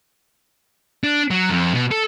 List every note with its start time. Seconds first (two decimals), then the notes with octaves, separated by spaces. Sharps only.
1.04 D4
1.31 F#3
1.51 F2
1.74 B2
1.91 A4